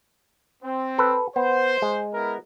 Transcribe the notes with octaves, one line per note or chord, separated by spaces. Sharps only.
C4
A4 B4
B3 C5
G#3
B3 E4 A#4